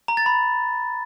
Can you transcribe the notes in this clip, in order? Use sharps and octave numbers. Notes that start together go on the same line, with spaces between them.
A#5
A6
B5